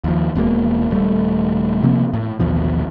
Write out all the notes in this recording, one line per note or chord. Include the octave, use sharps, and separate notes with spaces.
D#2 F3
E1 B2 G#3 A#3
D#1 G3 A3
C3 F3 A#3 C4
A2
A1 D#2 B2 F3